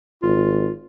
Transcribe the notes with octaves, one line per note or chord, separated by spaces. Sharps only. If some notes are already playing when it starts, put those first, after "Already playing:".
G#1 F4